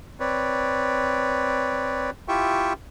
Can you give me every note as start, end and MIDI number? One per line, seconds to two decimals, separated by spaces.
0.20 2.10 60
0.20 2.10 71
0.20 2.10 73
0.20 2.10 74
2.28 2.73 64
2.28 2.73 65
2.28 2.73 67
2.28 2.73 76
2.28 2.73 79
2.28 2.73 85